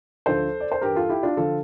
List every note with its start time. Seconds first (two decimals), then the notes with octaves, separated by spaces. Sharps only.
0.26 D2 D3 F3 A4 C5
0.60 D5
0.72 C5
0.81 G2 E3 G4 A#4
0.95 F4 A4
1.09 E4 G4
1.23 D4 F4
1.37 D3 F3 F4 A4